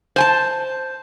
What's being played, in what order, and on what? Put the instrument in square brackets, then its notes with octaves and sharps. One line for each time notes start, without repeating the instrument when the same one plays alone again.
[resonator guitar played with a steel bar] C5 G#5 A5